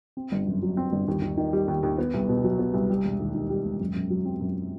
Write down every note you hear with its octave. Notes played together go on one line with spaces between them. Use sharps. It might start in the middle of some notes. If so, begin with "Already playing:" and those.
C4
G1
F#2
F#3
C4
G1
D#2
D#2
D#3
G3
D#2
D#2
B3
C2
B2
F#3
B3
C2
G3
E1
D#2
D#3
G3
E1
F#2
F#2
F#3
C4
F#2